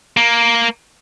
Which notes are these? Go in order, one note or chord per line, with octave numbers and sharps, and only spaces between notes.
A#3